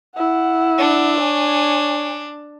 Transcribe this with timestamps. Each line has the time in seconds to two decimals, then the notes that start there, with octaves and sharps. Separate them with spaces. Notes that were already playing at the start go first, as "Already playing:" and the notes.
0.16 E4 F#5
0.79 D4
1.17 C#5 G#5